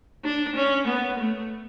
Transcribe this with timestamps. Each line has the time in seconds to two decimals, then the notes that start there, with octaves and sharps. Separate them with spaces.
0.24 D4
0.56 C#4
0.88 B3
1.19 A3